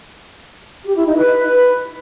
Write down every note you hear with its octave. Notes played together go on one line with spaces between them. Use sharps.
G4
E4
D#4
B4